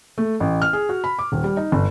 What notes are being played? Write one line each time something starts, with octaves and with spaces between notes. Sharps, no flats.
A3
A1
F6
G#4
F#4
B5
D6
D#1
G3
D#4
G1